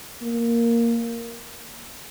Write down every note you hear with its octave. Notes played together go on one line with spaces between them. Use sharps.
A#3